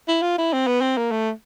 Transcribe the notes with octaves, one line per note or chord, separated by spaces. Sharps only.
E4
F4
E4
C4
B3
C4
A#3
A3